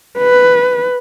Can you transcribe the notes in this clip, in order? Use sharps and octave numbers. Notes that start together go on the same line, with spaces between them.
B4